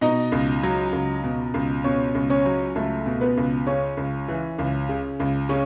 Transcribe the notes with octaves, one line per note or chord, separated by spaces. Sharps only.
B2 D#4 D#5
C#2
F#3
C#2
B2
C#2
B2 C#4 C#5
C#2
C#4 C#5
F#3
C#2 A3 A4
B2
B3 B4
C#2
C#3 C#4 C#5
C#2
E3
C#2
C#3
C#2
C#3 C#4 C#5